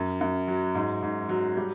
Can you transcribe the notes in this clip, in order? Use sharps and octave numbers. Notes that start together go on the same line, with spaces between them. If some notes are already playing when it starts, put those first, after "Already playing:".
Already playing: F#2
F#2
F#3
G#2
G#2
F#3
G3